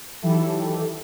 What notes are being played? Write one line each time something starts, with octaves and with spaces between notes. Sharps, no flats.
D#3 E3 F#3 E4 G4 A4